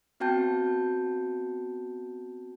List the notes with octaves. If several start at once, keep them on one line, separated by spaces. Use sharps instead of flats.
B3 C4 F#4 G5 A5 G6